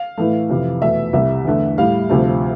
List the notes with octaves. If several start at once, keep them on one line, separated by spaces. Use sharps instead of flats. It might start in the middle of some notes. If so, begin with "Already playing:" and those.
Already playing: F5
A2 E3 A3
F2 C3 E3
E2 B2 A3 E5
C2 C3 G3 E5
E2 D3 A3
A2 G3 F5
D2 C3 F3 A3